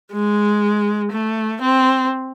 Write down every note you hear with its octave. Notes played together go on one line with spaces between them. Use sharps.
G#3
A3
C4